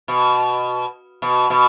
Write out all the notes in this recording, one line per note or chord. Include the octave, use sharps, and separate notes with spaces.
B2
B2
B2